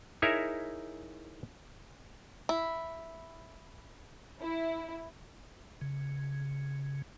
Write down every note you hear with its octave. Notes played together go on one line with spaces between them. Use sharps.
D#4 E4 G#4 A#4 C#5 E5
E4
E4
C#3